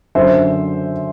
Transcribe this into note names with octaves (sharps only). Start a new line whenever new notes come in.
F#2 D3 C5 E5